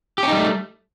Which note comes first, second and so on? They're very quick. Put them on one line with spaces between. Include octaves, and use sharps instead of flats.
G4 C#4 D#4 G3 A3